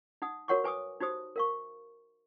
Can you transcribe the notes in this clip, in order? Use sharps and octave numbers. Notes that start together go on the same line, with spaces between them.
D#4 F#5 D#6
F#4 A#4 C#5 F#5 C#6 D6
B4 G#5 D6 D#6
D#4 F#4 G4 C5 D#6
A#4 F5 C#6